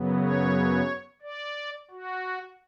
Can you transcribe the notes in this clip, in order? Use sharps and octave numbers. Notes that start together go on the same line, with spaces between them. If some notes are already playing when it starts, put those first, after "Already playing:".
Already playing: F#2 C#3 F#3 B3
C#5
D5
F#4